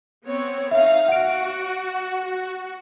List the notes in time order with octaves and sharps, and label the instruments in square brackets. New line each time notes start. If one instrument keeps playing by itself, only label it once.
[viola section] B3 C4 C#5
[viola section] D#4 F5 [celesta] E5
[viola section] F#4 [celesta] F#5 D7
[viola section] F#4